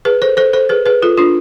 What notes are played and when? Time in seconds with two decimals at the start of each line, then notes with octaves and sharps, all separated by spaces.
0.05 G#4 B4
0.22 A4 C5
0.37 A4 C5
0.53 A4 C5
0.69 G#4 B4
0.86 G#4 B4
1.02 F4 A4
1.17 D4 F4